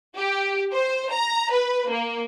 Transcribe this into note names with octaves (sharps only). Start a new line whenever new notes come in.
G4
C5
A#5
B4
A#3